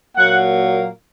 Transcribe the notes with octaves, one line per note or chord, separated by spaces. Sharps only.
A#2 F#3 A#3 F#5